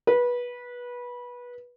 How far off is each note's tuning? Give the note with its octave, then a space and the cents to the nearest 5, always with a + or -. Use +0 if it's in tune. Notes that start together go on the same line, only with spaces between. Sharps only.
B4 -20